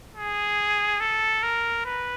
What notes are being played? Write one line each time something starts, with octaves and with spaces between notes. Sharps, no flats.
G#4
A4
A#4
B4